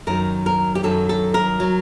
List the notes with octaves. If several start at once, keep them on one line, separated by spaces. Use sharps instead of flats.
F#2 D#3 F#3 A#4
A#4
G4
F#2 D#3 F#3 A4
A4
A#4
F#3